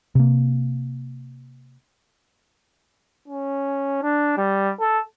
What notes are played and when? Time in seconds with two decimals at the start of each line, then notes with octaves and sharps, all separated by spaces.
0.15 C3 A#3
3.28 C#4
4.02 D4
4.37 G3
4.80 A4